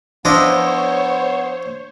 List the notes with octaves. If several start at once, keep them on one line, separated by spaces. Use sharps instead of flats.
F3 B3 D4 E4 C5 C#5 D#5